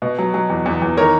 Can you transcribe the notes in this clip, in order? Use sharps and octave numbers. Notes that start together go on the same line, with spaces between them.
B2
F#3
F#3
E2
E2
E2
D#3 A#4 C#5